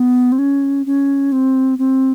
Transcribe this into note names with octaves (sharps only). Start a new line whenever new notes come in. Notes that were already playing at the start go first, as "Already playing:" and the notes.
Already playing: B3
C4
C#4
C#4
C4
C4